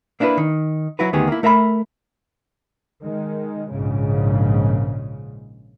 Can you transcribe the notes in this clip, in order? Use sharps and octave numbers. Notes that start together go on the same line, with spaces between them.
A#3 D4 E4 A4 B4
D#3
F#3 E4 F#4 B4
D2 D#3 B3 G4 G#4
A#3 E4
A3 A#4 E5 A5 B5
D#3 G#3
A#1 G#2 C#3